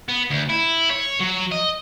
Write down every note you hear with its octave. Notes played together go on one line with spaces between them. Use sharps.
B3
D2
E4
C#5
F#3
D#5